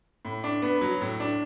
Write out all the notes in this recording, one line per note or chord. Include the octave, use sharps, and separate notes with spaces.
A2
D4
B3
F#3
A2
D4